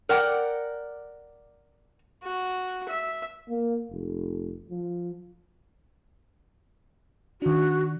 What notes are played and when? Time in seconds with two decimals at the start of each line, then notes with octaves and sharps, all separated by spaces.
0.09 A#4 D5 F#5 G5
2.23 F#4
2.88 E5
3.49 A#3
3.90 F1
4.69 F3
7.42 D#3 D4 F#4